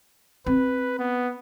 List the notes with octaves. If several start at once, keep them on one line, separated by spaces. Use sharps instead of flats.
C4 B4
B3